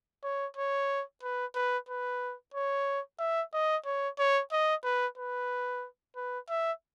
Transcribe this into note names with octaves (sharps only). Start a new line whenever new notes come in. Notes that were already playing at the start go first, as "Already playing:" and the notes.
C#5
C#5
B4
B4
B4
C#5
E5
D#5
C#5
C#5
D#5
B4
B4
B4
E5